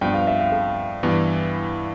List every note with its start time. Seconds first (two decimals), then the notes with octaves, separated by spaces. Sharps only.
0.01 G2 F3 B3 G5
0.14 F5
0.27 E5
0.39 F5
0.52 A4
1.03 G2 E3 B3